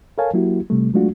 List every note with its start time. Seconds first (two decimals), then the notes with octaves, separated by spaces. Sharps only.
0.18 A4 A#4 C#5 F5 G#5 A5
0.34 F#3 A#3 E4 F#4 G4
0.70 C3 G3 A3
0.94 F#3 G#3 A3 D4 F4 F#4